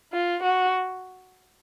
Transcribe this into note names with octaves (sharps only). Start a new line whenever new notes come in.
F4
F#4